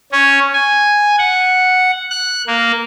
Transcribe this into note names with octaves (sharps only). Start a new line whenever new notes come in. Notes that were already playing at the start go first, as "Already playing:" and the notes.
C#4
G#5
F#5
F#6
A#3